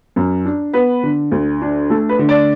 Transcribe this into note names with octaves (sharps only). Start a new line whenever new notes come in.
F#2
D4
B3 B4
D3
D2
D4
A3 A4
B4
D3
D5